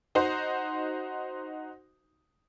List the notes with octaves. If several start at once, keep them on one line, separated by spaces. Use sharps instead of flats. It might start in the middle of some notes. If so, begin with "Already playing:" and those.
D#4 F#4 C5